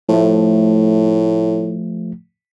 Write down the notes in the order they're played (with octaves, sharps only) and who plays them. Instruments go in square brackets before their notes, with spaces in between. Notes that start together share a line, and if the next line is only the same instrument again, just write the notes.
[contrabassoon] A2 [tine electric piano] F3 A3